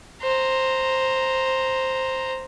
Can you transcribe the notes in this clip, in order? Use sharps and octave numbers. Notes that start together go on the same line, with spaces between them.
C5 A#5